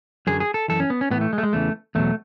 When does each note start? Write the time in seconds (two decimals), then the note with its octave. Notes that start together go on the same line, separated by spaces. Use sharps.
0.27 F#2 D3 F#3 G#4
0.40 G#4
0.54 A4
0.68 F#2 E3 A4
0.80 C#4
0.90 B3
1.01 C#4
1.10 A2 E3 B3
1.21 A3
1.33 G#3
1.38 A3
1.43 G#3
1.53 E2 C#3 E3 A3
1.95 E2 B2 F#3 A3